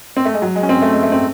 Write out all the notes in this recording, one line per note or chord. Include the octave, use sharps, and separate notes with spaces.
C4
A3
G#3
F#3
G#3
C#4
C4
A3
G#3
A3
C4